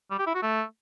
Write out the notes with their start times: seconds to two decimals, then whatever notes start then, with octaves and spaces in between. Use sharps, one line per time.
0.11 G3
0.19 G4
0.27 E4
0.35 F#4
0.42 A3